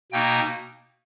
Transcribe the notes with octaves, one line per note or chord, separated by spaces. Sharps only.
B2 A#3 D#4 G5